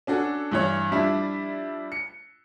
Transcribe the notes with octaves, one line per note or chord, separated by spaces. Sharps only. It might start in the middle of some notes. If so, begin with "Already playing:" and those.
C#4 D4 F#4 A4
G2 E3 C#5
F3 G3 D4 E4
C#7